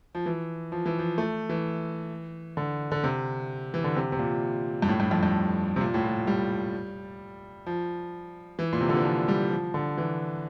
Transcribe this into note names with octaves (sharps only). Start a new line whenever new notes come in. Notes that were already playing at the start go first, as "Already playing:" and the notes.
F3
E3
F3
E3
F3
A3
E3
D3
D3
C3
E3
D3
C3
C3
A#2
G2
A2
G2
F2
G2
C3
A#2
A2
A#2
G3
F3
E3
A#2
C3
D3
E3
F3
G3
F3
D3
E3